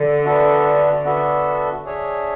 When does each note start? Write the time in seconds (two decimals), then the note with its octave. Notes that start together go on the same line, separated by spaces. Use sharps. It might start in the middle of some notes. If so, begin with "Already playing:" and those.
Already playing: D3
0.25 B3 D4 F#4 A4 E5
1.04 B3 D4 F#4 A4 E5
1.84 D4 G#4 C#5 E5